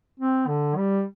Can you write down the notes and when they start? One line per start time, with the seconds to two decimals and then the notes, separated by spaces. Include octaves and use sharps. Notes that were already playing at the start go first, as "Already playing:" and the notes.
0.19 C4
0.48 D3
0.77 G3